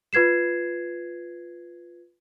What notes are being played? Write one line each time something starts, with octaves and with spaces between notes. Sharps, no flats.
F4 B4 G#6 C7 E7